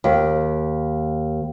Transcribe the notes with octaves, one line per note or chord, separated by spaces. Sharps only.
D#2